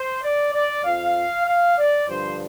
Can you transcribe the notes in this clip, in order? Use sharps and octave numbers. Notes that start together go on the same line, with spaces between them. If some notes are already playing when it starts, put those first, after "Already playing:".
Already playing: C5
D5
D5
F2 F3 F5
F5
D5
G2 D3 F3 C5